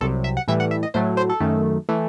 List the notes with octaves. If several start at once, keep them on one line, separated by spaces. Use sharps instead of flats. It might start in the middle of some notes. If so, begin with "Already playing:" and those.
C2 C3 F#3 A4
E5
F#5
A2 E3 G3 E5
F#5
E5
D#5
A2 F#3 A3 C5
C5
A4
F#2 D#3 A3
E3 A3